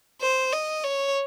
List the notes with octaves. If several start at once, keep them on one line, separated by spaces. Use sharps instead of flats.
C5
D#5
C#5